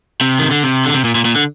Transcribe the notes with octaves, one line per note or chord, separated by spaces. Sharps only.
C3
D#3
D3
C3
D3
C3
A#2
A#2
A#2
D3